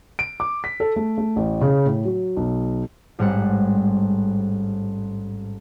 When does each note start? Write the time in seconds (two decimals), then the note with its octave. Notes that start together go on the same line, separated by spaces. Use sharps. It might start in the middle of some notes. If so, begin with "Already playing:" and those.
0.19 D7
0.40 D6
0.64 B6
0.80 A4
0.96 A3
1.18 A3
1.36 A1
1.61 C#3
1.86 A2
2.05 F#3
2.37 B1
3.19 A1 G#2 G3 C4 F#5 C#7